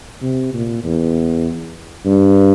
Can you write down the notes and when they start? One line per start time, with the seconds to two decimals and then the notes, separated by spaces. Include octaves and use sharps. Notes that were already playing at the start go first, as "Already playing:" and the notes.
0.22 C3
0.54 A#2
0.84 E2
2.06 G2